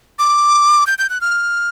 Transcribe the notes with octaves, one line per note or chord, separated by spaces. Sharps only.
D6
G6
G6
F#6
F6